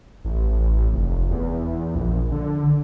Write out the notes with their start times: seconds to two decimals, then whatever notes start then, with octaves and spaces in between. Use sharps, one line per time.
0.25 A1
0.93 F1
1.31 E2
1.95 A#1
2.32 D3